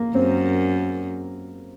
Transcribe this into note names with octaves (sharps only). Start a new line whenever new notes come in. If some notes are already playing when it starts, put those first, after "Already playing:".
Already playing: A#3
F#2 C4